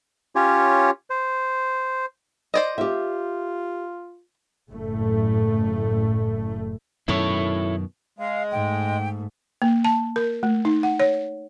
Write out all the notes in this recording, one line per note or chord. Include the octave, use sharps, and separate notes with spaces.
C#4 F4 G4 C#5
C5
C5 D5 D#5
F4 G4 E5
F#1 A2 A3
F#2 B2 D#3 E4 A4 C#5
G#3 F5
G#2 A3 G5
A#3
A5
A#4
A3
D#4
F#5
C#5